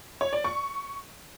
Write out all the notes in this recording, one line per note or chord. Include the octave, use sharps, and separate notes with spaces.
C#5
D5
C#6